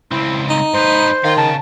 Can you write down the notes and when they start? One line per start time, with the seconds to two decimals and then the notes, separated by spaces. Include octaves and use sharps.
0.12 C#2 C4 E4
0.50 D#4
0.74 G#2 B4 C5
1.24 D#3 F5 C6
1.38 C#3 A5